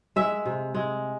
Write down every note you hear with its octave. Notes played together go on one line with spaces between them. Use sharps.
G#3 E5
C3
G#3